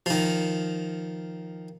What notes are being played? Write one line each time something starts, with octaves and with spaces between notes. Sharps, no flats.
D#3 F3